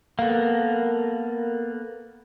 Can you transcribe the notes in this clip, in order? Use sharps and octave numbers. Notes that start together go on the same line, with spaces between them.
A#3 B3 A4 A#4 F5